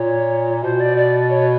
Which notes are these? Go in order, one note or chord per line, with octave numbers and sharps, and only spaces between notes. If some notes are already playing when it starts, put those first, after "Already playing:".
Already playing: A#2 C#5
B2 C5
D5
D5
C#5